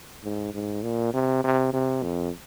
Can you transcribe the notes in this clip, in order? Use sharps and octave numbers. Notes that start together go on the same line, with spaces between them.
G#2
G#2
A#2
C3
C3
C3
F2